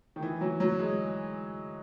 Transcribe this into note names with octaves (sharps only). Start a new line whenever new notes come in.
D#3
E3
F#3
F#3
G#3